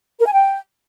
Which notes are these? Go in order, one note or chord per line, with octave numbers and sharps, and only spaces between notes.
A#4
G#5
G5